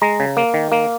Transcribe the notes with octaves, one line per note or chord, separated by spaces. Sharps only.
G#3 A#5
C#3
A#3
D#3
A#3